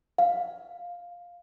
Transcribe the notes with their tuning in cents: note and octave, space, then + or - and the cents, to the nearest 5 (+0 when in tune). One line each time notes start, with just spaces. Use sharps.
F5 +5